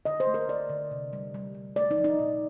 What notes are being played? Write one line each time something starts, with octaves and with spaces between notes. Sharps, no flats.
D3 D#5
C5
A3
A#4
D3 D5
D3
C3
G3
G3
G3
A3 D5
D#4
F3
D#4
A#2